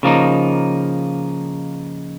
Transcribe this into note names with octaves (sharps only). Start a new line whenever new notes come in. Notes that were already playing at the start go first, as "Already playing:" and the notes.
C#3 F3 A#3 D#4